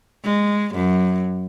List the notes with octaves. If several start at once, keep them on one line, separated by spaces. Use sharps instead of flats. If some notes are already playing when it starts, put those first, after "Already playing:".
G#3
F#2